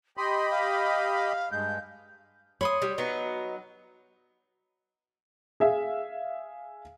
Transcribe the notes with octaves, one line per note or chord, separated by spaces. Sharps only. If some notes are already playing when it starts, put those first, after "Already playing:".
G4 D#5 B5 C6
F5
G2 G#3 G6
C#5 B5 C6 D#6
G3
F#3 B3 D#4
G#4 E5 F5